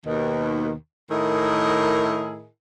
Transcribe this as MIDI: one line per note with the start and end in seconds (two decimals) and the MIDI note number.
0.06 0.74 39
0.06 0.74 47
0.06 0.74 51
1.11 2.48 45
1.11 2.48 51
1.11 2.48 64
1.11 2.48 68
1.11 2.48 70
1.11 2.48 75